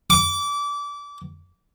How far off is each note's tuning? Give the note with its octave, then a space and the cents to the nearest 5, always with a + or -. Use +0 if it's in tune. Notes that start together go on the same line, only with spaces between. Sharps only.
D6 -25